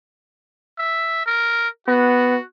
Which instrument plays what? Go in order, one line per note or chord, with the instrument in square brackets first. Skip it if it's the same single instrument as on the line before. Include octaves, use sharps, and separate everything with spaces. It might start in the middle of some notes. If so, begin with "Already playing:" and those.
[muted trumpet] E5
A#4
[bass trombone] B3 [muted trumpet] F#4